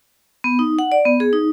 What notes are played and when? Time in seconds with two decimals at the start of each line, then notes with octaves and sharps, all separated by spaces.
0.44 B3
0.59 D#4
0.79 F#5
0.92 D5
1.05 B3
1.20 G#4
1.33 D#4